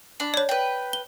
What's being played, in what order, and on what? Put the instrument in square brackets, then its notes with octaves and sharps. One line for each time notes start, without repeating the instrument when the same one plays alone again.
[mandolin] D4 B5
[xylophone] C#5 D5
[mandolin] B4 G5
[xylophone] G7